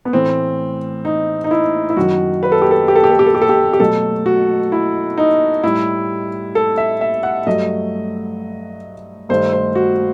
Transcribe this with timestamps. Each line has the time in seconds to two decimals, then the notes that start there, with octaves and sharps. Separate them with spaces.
0.05 B3
0.13 A2 E3 A3 C4
1.05 D#4
1.44 D#4
1.51 E4
1.90 E4
1.97 F#2 D#3 F#3 F#4
2.43 B4
2.52 A4
2.62 G4
2.71 A4
2.88 G4
2.96 A4
3.04 G4
3.11 A4
3.19 G4
3.26 A4
3.34 G4
3.42 A4
3.49 G4
3.73 G4
3.80 B2 F#3 A3 A4
4.26 F#4
4.72 E4
5.18 D#4
5.63 A2 G3 E4
6.55 A4
6.77 E5
7.01 E5
7.23 F#5
7.47 G2 F#3 A3 D#5
9.29 G2 D#3 A3 C5
9.53 C5
9.75 F#4